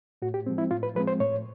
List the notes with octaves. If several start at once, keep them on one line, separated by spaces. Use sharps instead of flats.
A2 F#4
G4
F3 G#3 C4
E4
A2 F4
B4
F3 G#3 C4 B4
C5
A2 C#5